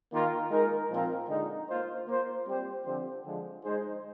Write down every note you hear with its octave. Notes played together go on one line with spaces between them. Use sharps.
D#3 A#3 F4 A#4
G#3 D#4 A#4
A#2 F3 C4 F4 A#4
D3 G#3 D#4
A#3 F4 C5
A#3 F4 C5
G3 C4 G4 C5
D3 F3 C4 G4 C5
D3 F3 G#3
G#3 D#4 G#4 C5